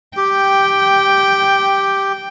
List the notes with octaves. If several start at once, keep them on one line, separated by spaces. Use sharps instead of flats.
G4 G5